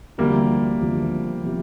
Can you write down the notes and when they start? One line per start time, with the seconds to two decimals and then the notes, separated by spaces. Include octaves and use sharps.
0.18 D2 C3 F3 G3 A#3
0.81 D2 C3 F3
1.43 C3 F3